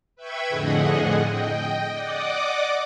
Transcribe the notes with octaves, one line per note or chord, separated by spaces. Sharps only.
B4 E5 G5 B5 C#6 G#6
F2 A2 D3 G#4 D#5 F#5
D#5 G5
D5 D#5 F#5 D6 D#6